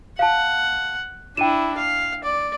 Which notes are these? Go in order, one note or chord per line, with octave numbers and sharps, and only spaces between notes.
F5 F#5 A5
D4 E4 G5 D#7 E7
F5
D5